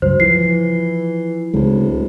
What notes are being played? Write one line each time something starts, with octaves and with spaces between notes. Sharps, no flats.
C#2 G2 F#3 C5
E3 F3 C7
D1 C#2 G#3